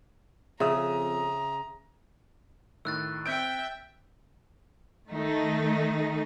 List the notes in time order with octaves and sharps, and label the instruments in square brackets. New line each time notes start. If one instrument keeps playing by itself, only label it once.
[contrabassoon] F2 [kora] C#3 [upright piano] E5 D#6 [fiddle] A#5
[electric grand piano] A2 D#3 [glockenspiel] E6 F#6 A6
[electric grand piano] C4 G6 D7 [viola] E5 G5
[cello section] D#3 A3 D#4